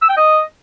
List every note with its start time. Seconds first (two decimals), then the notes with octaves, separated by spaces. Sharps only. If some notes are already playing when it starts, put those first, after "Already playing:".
0.02 E6
0.09 G5
0.17 D#5